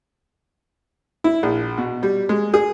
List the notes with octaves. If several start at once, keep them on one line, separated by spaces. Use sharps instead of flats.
E4
A#1
B2
G3
G#3
G#4